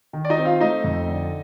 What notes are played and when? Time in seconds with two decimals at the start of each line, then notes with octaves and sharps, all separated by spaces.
0.13 D#3
0.25 D5
0.30 D#4 D#5
0.38 C4
0.45 F4 F5
0.60 A3 D#4 D#5
0.84 F2
1.08 D3